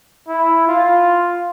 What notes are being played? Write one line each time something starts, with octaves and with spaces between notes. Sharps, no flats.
E4
F4